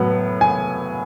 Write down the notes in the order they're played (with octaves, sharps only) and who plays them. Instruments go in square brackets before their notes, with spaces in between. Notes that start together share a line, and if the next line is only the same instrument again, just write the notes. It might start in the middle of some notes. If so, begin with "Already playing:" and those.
Already playing: [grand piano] A2 F#3 B3
G#5